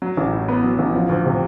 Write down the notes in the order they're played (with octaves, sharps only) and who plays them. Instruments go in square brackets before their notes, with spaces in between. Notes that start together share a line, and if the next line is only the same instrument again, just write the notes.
[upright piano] F#3
A1
A2
B3
F#3
A1
F3
D2
C3